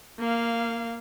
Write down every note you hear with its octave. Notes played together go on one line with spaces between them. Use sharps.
A#3 F5